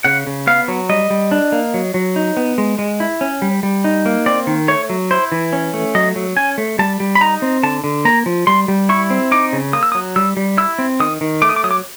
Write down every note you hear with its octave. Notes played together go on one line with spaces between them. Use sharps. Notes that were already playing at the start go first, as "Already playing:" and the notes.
C#3 F#5
C#3
B3 F5
F#3
G3 D#5
G3
D4
A#3
F#3
F#3
D#4
B3
G#3
G#3
E4
C#4
G3
G3
D#4
A#3
C4 D5
D#3
A3 C#5
F#3
E4 C5
E3
C#4
A3
F#3 D#5
F#3
C#4 G#5
A3
G3 A5
G3
B5
D#4 A#5
C4
D3 A5
D3
A#3 A#5
F3
G3 C6
G3
E4 C#6
C4
D#4 D6
C#3
A#3 D#6
E6
D#6
F#3
G3 E6
G3
E4 E6
C4
D#3 D#6
D#3
A3 D6
D#6
D6
F#3 D#6
D6